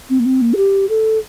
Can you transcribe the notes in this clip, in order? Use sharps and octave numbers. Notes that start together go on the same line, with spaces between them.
C4
A#3
C4
A#3
A4
G4
A4